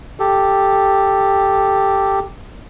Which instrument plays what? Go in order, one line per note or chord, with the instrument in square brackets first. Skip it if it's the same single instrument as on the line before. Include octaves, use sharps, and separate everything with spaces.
[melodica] G4 A4